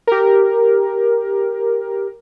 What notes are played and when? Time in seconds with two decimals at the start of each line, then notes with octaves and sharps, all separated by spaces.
0.07 G4 A#4